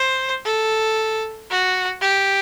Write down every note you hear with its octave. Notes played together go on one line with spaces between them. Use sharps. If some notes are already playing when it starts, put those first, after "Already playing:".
Already playing: C5
A4
F#4
G4